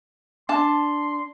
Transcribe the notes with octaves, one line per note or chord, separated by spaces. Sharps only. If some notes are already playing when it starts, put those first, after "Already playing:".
D4 A5 C6